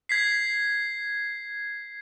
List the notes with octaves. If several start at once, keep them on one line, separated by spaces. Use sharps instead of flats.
G#6 B6 C7